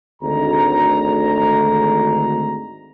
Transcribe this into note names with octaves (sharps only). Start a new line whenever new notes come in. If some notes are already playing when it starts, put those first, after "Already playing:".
G#1 D2 A#5